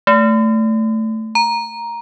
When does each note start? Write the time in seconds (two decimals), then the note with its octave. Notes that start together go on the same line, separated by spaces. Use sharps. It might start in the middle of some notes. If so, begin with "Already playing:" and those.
0.07 A3
1.35 A#5